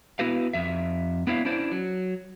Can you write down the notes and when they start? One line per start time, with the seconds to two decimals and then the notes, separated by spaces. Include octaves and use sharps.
0.19 B3 E4 F#4 B4 F5
0.53 F2 E5
1.27 B3 D4 E4 C#5 E5 F5
1.45 C#4 D4 E4 C5 D5
1.71 F#3